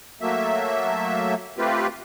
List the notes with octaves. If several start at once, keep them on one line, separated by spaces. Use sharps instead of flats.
F#3 A3 A#3 E5
A3 C4 F4 G4 B4